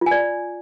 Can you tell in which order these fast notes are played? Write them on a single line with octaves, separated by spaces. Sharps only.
F4 G#5 D5